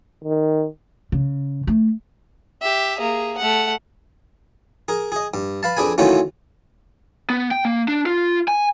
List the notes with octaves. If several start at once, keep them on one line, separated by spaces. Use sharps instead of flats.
D#3
C#3
A3
G4 E5
A#3 G#4
A3 F#5
G#4 A#4
G#4 D#5
G2
B4 F5 A5
F2 D4 G#4 B4 G#5
D#3 E3 F#3 A3 C#4 F4
B3
G5
A#3
D4
F4
G#5